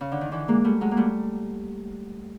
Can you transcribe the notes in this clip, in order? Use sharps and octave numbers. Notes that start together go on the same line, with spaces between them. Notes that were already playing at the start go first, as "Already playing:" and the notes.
C#3
D3
D#3
D3 E3
G#3 A#3
G3 A3
F#3 G#3
A#3
G3 A3